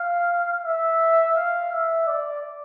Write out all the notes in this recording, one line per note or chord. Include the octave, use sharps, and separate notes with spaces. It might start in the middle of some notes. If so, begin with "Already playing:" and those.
Already playing: F5
E5
F5
E5
D5